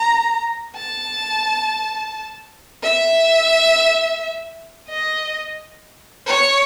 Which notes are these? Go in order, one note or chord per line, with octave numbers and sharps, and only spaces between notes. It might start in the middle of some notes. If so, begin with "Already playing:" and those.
Already playing: A#5
A5
E5
D#5
C#5